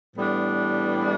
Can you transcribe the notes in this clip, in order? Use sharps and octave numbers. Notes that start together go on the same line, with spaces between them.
A2 E3 G3 B3 D4